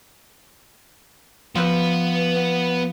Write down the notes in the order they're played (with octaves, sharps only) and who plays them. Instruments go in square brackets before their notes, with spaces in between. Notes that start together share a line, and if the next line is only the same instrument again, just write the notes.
[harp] F3 E6 F#6 [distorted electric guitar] B3 B4